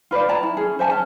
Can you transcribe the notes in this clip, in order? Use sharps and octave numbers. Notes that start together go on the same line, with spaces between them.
F4 B4 C5 D5
C#5 D5 A5 A#5
E4
C#4 G#4
C5 E5 G#5 A5
C#4 A5